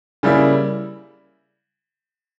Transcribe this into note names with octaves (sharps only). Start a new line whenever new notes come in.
C#3 G3 A#3 E4